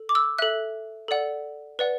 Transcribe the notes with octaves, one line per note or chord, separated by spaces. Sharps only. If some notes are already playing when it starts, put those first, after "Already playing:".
Already playing: A4
D6
E6
A4 E5 F#6
A4 D5 F#5
B4 D5 F#5